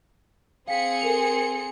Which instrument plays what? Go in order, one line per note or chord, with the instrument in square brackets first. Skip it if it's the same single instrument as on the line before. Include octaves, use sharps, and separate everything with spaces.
[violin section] C4 G#4 C#7 [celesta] F5 G5 B6
[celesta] A4 A#4 F7